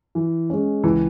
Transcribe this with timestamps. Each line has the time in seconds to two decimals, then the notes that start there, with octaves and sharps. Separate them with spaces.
0.15 E3
0.50 G#3 C#4
0.84 C#2 E3